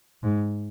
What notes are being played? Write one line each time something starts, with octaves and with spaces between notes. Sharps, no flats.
G#2